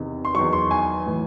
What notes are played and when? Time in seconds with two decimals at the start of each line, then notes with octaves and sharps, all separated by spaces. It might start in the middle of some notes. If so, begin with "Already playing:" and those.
Already playing: E2 C3 D#3
0.25 C6
0.34 E2 D#3 F#3 C#6
0.53 C6
0.71 G#5
1.06 A2 E3